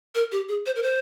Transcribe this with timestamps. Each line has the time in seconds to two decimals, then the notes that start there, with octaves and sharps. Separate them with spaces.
0.15 A#4
0.32 G4
0.49 G#4
0.66 C5
0.76 A#4
0.83 C5